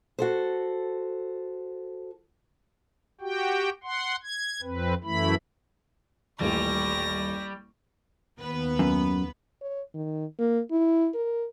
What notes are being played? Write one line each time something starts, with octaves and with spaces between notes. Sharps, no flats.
F#4 A4 C5
F#4 G4 G5
F#5 C6
G#6
F2 C4 B4
F#2 E3 A3 E4 B5
D#1 A1 G3 C#6 A#6
D#2 B3 B4
F#2
C#5
D#3
A#3
E4
A#4